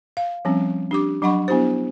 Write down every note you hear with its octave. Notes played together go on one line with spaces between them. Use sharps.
F5
F3 G3 C4 C#4
D4 G4 D6
F#3 D4 D#5 F#5 B5 C#6
B3 D4 E4 G4 C5